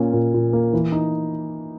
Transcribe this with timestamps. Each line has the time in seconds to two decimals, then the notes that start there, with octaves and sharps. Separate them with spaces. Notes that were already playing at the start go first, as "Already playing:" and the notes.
Already playing: A#2 A#3 C#4
0.13 A#2
0.34 A#2
0.53 A#3
0.73 E3
0.92 D#4